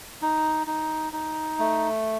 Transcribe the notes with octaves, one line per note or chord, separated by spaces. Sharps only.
D#4
D#4
D#4
A3